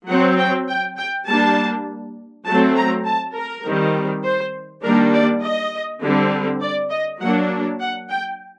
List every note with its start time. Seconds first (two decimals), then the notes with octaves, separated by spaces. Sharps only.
0.08 F#3 C4 F#5
0.38 G5
0.68 G5
0.97 G5
1.27 G3 A#3 D4 A5
2.46 F#3 A3 C4 A5
2.76 A#5
3.06 A5
3.35 A#4
3.64 D#3 G3 C4
4.24 C5
4.83 D#3 G3 A#3 D4 A#4
5.13 D5
5.42 D#5
6.01 D3 G3 C4
6.61 D5
6.91 D#5
7.20 F#3 A#3 D4 F#5
7.80 F#5
8.10 G5